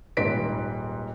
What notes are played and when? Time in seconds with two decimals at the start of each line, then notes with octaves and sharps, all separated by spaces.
0.17 D#1 G#1 G#2 B4 B6 D7